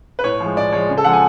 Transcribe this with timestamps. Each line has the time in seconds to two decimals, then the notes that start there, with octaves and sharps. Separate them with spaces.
0.19 B4
0.24 A2 C#5
0.40 F3 G#3
0.57 A2 D5
0.72 F3 G#3 C#5
0.89 C#3
0.98 A4
1.04 F3 G#3 F#5
1.13 G#5